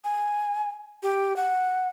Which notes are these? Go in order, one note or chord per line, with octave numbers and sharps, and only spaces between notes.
G#5
G4
F#5